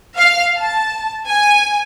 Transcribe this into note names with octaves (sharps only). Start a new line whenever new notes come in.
F5
A5
G#5